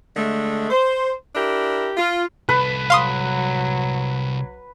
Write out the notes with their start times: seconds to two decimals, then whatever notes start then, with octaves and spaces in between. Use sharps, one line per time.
0.17 D3 G#3 A3
0.71 C5
1.35 D4 E4 G4 A#4
1.97 F4
2.49 C2 A4 B4
2.90 F#3 F5 C6 D#6